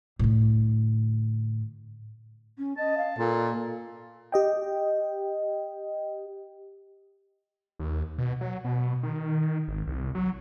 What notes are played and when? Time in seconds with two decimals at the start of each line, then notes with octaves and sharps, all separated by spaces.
0.19 A2 D3
2.58 C#4
2.78 D#5 A5
2.98 F5
3.18 A#2 A4
4.32 G4 D#5 G5
7.79 D#2
8.18 B2
8.41 F#3
8.65 B2
9.03 D#3
9.67 G#1
9.87 C2
10.15 F#3